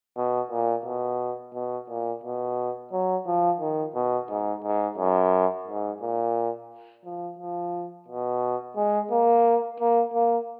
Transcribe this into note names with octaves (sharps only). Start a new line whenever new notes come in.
B2
A#2
B2
B2
A#2
B2
F#3
F3
D#3
B2
G#2
G#2
F#2
G#2
A#2
F3
F3
B2
G#3
A#3
A#3
A#3